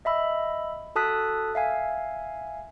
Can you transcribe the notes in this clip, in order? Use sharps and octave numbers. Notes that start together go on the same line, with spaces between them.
D#5 E5 B5 E6
F#4 A4 A5 D#6 F#6 B6
E5 F5 G#5